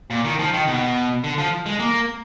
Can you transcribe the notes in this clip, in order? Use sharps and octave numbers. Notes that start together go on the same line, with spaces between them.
A#2
D#3
F3
D#3
B2
D3
F3
G#3
A#3